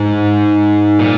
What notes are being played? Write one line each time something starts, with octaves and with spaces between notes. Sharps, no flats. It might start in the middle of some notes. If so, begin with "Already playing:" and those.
Already playing: G#2
A#2